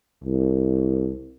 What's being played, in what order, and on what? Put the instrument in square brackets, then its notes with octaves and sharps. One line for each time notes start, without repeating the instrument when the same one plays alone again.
[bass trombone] C2